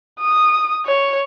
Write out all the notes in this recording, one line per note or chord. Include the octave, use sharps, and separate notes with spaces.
D#6
C#5